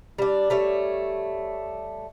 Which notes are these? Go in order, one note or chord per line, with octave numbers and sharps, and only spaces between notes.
G3 D4
G3 A3 C#5